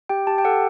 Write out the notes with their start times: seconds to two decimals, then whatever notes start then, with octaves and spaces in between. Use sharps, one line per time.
0.09 G4 G5
0.27 G4 A5
0.38 G5
0.45 A4 F#5